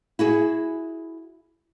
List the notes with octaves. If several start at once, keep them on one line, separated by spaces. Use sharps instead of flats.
E4 F#4 G#4